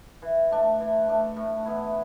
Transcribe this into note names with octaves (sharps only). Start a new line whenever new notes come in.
E3
A3 D4
E3
A3 D4
A2
E3 B3 E4